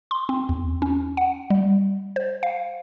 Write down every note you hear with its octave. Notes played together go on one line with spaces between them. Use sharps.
C6
C4
E2
C#4
F#5
G3
C5
F5